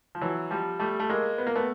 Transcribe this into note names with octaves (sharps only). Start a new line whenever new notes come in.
F3
E3 F#3
F3 G3
G3 A3
A3
G#3 A#3
B3
A#3
A3 B3